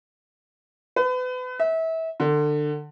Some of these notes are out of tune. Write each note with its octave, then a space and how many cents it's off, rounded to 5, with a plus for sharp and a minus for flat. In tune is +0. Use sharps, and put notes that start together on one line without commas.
B4 +35
E5 -30
D3 +25